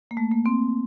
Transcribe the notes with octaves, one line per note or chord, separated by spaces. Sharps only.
A#3
A3
A#3
C4